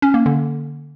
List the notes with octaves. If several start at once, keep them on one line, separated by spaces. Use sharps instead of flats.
C#4
A#3
D3